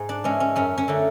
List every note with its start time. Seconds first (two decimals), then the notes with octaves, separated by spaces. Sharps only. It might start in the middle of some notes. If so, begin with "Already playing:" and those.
Already playing: G#2 G#4
0.09 D4
0.24 E3 G#3 C#4
0.40 C#4
0.56 F#2 C#4
0.78 C#4
0.88 D3 F#3 A3